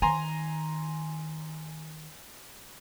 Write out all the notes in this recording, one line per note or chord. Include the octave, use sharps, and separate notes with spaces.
D#3 G#5 A#5 C6